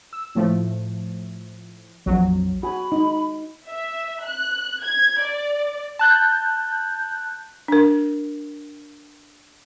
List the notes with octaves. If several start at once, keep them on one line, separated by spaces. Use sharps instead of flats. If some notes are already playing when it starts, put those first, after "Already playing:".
E6
A2 F3 A3
A#1 F2 F#3
F#4 G#5 B5
D#4
E5
F#6
G#6
D5
A5 F#6 G6
D4 A#4